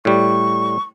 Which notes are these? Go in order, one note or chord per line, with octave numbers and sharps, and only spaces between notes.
A2 G3 C#6